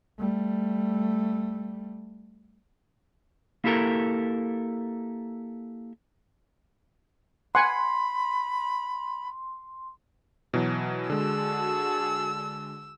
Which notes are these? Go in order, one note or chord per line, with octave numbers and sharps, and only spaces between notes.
G3 A3
A#3 E4 G4 A4 A#4
F#5 G#5 B5 C6
B2 E3 F#3
D3 G#3 F#4 G#4 A5 E6